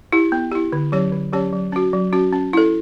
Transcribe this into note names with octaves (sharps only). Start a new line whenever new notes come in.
E4 G4
B3
E4 G4
D3
F#3 C#4 G4 C#5
D3
F#3 C#4 G4 C#5
F#3
C#4 F#4
F#3
C#4 F#4
C#4
E4 A4